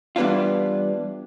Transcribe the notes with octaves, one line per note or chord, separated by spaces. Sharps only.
E3 G3 B3 D4 F4